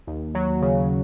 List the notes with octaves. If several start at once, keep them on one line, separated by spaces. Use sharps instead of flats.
D#2
F#3
C#3